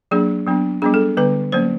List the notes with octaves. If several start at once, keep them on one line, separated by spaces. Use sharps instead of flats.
F#3 A#3 D4 G#4
F#3 B3 D4
G3 B3 D4 G#4
A4
D3 G3 B3 B4
F#3 A#3 C#4 C5